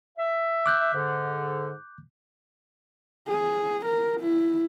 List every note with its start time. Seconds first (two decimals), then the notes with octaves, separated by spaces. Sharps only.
0.18 E5
0.66 D6 F#6 G6
0.94 G#2 D3
3.28 G#4
3.86 A#4
4.20 E4